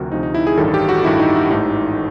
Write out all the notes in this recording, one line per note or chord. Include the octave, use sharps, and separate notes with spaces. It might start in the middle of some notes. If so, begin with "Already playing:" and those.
Already playing: D2 C3 F3 F#4 A#4
D2 C3 F3 D#4
D#4
E4
G#4
A1 G2 D#3 A4
G4
F#4
A1 G2 D#3 E4
D#4
E4
A1 G#2 E3 A3 D#4